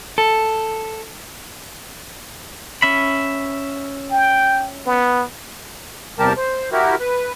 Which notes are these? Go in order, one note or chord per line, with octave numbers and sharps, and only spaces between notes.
A4
C#4 E5 B5
G5
B3
E2 C3 G3 G4 A#4 A5
C5
E4 F#4 G4 A#4
B4